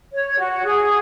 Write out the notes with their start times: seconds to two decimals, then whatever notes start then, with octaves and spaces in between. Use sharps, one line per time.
0.13 C#5
0.39 F#4
0.65 G#4